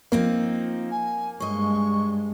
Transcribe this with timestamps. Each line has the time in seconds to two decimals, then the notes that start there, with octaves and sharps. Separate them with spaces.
0.12 F3 A#3 C4 D#4
0.91 G#5
1.40 G2 G#3 C5 D#5 C#6